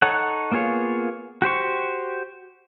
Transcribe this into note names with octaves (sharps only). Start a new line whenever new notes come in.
D#4 A4 C#5 F#5
A#3 B3 F4 G#4 C#5
F#4 G4 C5 C#6